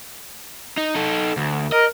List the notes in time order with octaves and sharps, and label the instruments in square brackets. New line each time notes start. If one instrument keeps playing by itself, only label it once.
[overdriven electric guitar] D#4
D#4 A4
D2
[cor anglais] A#4 [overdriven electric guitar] D#5